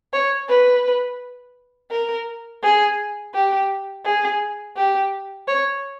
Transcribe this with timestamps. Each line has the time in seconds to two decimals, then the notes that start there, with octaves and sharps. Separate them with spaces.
0.13 C#5
0.49 B4
1.91 A#4
2.63 G#4
3.34 G4
4.05 G#4
4.77 G4
5.48 C#5